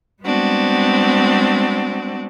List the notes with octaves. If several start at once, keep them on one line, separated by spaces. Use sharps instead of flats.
G3 G#3 B3 C4 D4 F#4